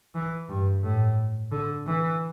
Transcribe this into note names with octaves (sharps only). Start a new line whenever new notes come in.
E3
G2
A2
D3
E3